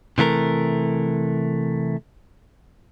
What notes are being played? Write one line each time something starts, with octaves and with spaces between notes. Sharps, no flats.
C3 E3 A3 A#4